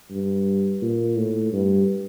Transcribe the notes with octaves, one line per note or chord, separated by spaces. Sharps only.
G2
A#2
A2
G2